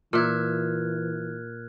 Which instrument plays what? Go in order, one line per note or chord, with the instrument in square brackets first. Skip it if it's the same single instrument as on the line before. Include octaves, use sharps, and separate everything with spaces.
[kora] A#2 E5 [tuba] E3 [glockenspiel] F6 F#6 G#6